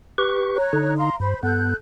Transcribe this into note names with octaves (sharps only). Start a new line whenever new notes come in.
G4 B4 C#6
C#5 A#5 F#6
D3 D#4
F5 A#5 C6
G2 C5 B5
G2 B3 A4 F#6 G6